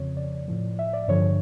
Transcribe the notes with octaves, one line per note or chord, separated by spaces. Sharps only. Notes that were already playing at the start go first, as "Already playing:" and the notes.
Already playing: F2 C#3 F3 C#5
D5
A2 F3
E5
D5
G2 D3 F3 C#5